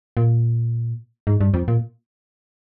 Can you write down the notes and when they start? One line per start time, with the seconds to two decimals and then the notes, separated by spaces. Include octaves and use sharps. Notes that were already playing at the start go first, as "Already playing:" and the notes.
0.17 A#2
1.27 G#2
1.41 G2
1.54 F2
1.68 A#2